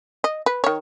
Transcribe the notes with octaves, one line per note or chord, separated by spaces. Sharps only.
D#5
B4
D#3 C#5